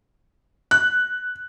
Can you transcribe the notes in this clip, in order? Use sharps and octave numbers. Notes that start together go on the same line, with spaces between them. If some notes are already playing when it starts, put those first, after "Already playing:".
F#6